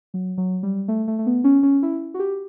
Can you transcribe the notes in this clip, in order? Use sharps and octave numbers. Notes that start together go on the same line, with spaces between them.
F#3
F#3
G3
A3
A3
A3
B3
C#4
C#4
E4
F#4
G4